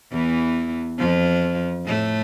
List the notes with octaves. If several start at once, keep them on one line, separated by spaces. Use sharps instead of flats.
E2 E3
F2 F3
A2 A3